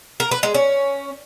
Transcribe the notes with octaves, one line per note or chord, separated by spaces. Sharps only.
A#4
B4
G#3
C#4